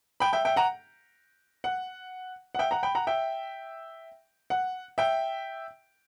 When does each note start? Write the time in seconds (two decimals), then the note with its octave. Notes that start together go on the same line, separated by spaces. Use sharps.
0.20 G5 B5
0.33 E5 G5
0.45 E5 G5
0.56 F#5 A#5
1.64 F#5
2.55 F#5
2.59 E5 G5
2.71 F#5 A#5
2.83 G5 B5
2.95 F#5 A#5
3.07 E5 G5
4.50 F#5
4.98 E5 G5